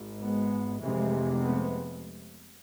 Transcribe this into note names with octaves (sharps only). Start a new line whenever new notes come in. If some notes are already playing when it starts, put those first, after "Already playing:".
Already playing: G#1 G#2
G#3 B3
F1 F2 C3 E3 G#3
G#3 B3